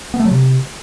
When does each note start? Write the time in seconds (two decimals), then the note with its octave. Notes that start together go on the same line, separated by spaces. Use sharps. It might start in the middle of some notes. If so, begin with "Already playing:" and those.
0.14 B3
0.20 A3
0.25 F#3
0.31 C3